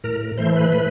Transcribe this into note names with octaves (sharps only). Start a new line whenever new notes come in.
A2 A#4
E3 A3 C5
B4
A2 B4